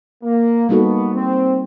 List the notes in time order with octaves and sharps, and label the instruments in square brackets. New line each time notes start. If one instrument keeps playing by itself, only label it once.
[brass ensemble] A#3
[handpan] G3 A#3 D#4 F#4 A4 [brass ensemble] B3
[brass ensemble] C4